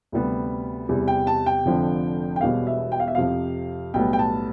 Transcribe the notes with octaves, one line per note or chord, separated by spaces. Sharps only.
D2 C3 G3 B3
E2 C3 G3
G5
A5
G5
F1 F2 D3 F3
G5
E1 E2 B2 G3 B3 F5
E5
G5
F5
E5
F2 C3 F3 F5
B1 A2 G3 B3 G5
G5
A5